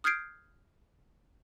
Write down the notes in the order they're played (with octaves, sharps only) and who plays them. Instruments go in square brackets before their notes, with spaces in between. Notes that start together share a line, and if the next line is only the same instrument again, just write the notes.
[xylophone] D#6 F6 G6 G#6 C7 D7